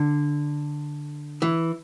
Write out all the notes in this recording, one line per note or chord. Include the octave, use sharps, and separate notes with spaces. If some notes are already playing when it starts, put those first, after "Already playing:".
Already playing: D3
E3